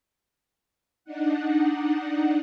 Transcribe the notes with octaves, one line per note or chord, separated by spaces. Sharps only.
D4 D#4 F#5